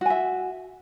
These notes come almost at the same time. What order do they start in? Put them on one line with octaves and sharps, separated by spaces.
F#4 G#5 E5